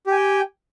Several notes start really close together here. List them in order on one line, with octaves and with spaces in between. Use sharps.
G4 G#5 G5